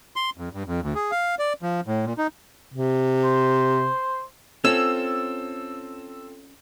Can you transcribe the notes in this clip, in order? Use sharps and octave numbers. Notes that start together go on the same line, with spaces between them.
C6
F2
G2
F2
D2
G#4
F5
D5
F3
A2
A#2
D#4
C3
C5
C4 C#4 F4 A4 E6